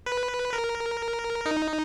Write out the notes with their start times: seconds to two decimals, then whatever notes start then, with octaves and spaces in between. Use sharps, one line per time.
0.06 B4
0.53 A#4
1.45 D#4